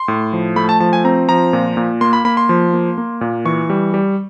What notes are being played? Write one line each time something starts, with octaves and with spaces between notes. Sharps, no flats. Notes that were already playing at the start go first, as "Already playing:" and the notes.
Already playing: C6
A2
F3
A3 B5
A5
F3 A5
G#5
C4 A#5
F3 A#5
A#2
A#2
A#3 C6
B5
A#3 B5
C6
F3
A#3
A#3
A#2
E3 C#6
G3
G3